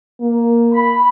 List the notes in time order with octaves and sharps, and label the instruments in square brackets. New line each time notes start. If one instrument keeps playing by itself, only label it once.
[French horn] A#3
[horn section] B5